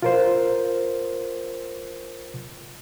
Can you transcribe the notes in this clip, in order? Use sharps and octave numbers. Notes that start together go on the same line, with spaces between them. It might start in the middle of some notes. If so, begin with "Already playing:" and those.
F4 A#4 C5